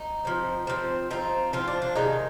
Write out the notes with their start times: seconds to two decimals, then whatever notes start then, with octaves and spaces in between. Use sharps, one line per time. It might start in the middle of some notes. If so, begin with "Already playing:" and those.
Already playing: D#4
0.25 F3 C4
0.67 F3 C4
1.11 F3 C4 D#4
1.53 F3 C4 F4
1.68 D4
1.82 D4
1.96 C3 D#3 G#3 D#4